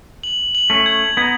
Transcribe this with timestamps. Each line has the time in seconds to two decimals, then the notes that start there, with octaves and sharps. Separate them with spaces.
0.23 F#7
0.55 F#7
0.70 A3 C#4
0.86 G#6
1.17 B3 D#4 G#6